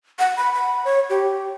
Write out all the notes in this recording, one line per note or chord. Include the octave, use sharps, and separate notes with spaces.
F#5
B5
B5
C#5
G4